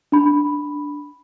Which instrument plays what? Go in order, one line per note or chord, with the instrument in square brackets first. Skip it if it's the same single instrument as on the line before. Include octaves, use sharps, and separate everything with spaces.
[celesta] D4 B5